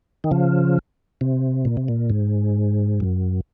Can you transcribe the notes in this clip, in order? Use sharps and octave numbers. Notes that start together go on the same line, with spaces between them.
D#3
C#3 F3
C3
A#2
C3
A#2
G#2
F#2